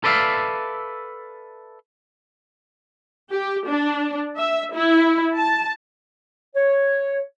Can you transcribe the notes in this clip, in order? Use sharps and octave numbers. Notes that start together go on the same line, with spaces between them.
A4 B4 D5 E5 F5
G4
D4
E5
E4
A5
C#5